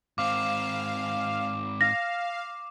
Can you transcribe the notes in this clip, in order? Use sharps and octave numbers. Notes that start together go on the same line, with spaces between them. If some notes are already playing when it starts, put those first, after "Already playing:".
G#2 C4 F5 D6
F5 A#6